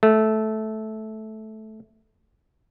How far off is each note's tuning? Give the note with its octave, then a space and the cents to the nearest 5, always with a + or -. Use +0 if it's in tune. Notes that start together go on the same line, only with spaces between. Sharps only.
A3 -10